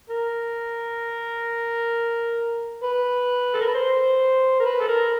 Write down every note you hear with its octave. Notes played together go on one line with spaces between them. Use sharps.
A#4
B4
A4
A#4
B4
C5
A#4
B4
A4
A#4